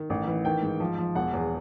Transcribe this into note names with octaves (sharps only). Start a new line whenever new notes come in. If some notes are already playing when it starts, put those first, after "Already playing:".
Already playing: D#3
A1
E3
D#3 G5
G#2
F3
F3
E1 F#5
E2